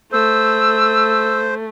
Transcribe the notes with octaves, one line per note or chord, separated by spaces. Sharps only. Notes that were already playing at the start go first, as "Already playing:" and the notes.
A3 C5 E6